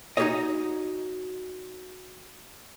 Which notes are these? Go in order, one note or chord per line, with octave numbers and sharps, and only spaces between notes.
D#4 F#4 G4 A#4 C#5 D#5